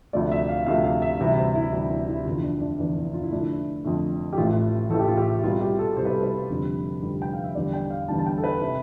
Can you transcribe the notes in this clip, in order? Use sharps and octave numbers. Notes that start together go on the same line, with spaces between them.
D2 C3 F3 A3 D5
E5
F5
D2 C3 F3 A3 F5
F5
E5
D2 C3 E3 G3 E5
C5
E4
D2 C3 E3 G3 D4
E4
E4
F1 E2 D3 F4
D4
D4
F1 E2 D3 D4
E4
F4
E4
F2 D3 A3 D4
E4
F2 D3 A3
G4
A1 A2 E3 A3 F4
A1 A2 E3 A3 A4
G4
F4
G4
C2 B2 G3 F4
G4
A4
C2 B2 G3 C5
B4
A4
B4
F1 F2 D3 G3
F1 F2 D3 G3
G5
F5
E5
E2 D3 G3 D5
G5
F5
E2 D3 G3 A5
A5
G5
A4
B4
C3